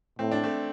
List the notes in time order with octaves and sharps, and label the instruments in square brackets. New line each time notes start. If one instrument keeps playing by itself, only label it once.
[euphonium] A2 [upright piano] C4
[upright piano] D4
A3 C4